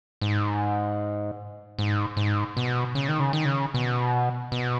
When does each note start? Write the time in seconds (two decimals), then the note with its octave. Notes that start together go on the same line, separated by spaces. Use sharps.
0.21 G#2
1.79 G#2
2.17 G#2
2.57 B2
2.95 C#3
3.09 D#3
3.20 C#3
3.33 D#3
3.45 C#3
3.74 B2
4.52 B2